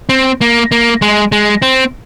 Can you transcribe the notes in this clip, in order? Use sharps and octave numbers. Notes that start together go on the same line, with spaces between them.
C4
A#3
A#3
G#3
G#3
C4